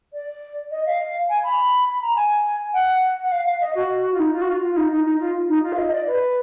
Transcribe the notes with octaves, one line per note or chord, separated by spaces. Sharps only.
D5
D#5
F5
G#5
B5
B5
A#5
G#5
F#5
F#5
F5
F5
D#5
F#4
F4
D#4
F4
F#4
F4
F4
D#4
D#4
D#4
F4
D#4
F4
F5
D#5
D5
B4